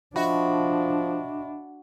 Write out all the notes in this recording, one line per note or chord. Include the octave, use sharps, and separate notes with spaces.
F3 D4 F#4 D#5 E5 B5